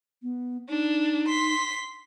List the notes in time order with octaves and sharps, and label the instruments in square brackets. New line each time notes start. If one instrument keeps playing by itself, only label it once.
[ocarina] B3
[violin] D4 [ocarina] D#4
[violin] C6 B6